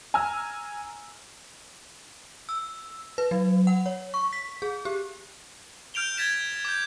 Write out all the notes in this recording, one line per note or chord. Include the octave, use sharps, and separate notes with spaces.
G#5 A#5 E6 F6
E6
B4
F#3
F#5
C#5
C#6
B6
G#4
G4
F6 G6 D7 F7 G7
G#6 A6 B6 E7 F7
D6 G6